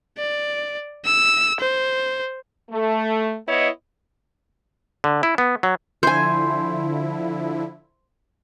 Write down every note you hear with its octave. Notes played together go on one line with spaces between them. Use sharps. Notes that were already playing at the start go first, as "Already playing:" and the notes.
D5
E6
C5
A3
B3 E4 C#5 D#5
D3
E4
B3
F#3
D3 F3 E4 C5 G#5